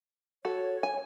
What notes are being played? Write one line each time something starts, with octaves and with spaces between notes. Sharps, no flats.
F#4 A4 C#5
G#5